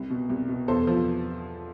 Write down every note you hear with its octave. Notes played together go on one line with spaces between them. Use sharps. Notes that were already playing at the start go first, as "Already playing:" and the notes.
Already playing: C2
B2
C2
B2
E2 A4 C5
F3